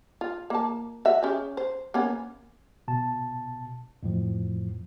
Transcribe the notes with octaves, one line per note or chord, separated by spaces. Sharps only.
F4
A#3 A5
F#4 E5
C#4 G4 G#4
C5
A#3 B3 C#4
B2 A5
F2 A2 F3